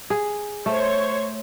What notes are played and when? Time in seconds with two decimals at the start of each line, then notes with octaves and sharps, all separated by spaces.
0.10 G#4
0.66 A3 C5 C#5